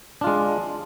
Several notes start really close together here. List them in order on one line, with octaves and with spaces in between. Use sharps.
D4 F4 G#3